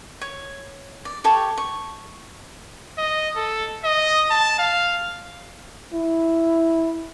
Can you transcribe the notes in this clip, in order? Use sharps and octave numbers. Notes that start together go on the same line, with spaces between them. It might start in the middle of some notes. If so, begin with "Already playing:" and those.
C#5
D5
G4 A4 C#5 C#6
C#6
D#5
A4
D#5
A5
F5
E4